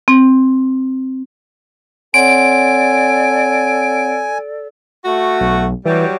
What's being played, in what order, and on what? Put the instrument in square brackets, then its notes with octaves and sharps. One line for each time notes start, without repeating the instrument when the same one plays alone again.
[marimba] C4
[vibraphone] C4 C#5 F#5 [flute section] A4 D5 [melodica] G#5 [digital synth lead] D7
[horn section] A3 F#4
[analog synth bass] B1
[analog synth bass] E3 [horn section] F#3 G3